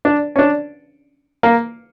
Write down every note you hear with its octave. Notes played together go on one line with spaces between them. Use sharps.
D4
C#4
D4
A#3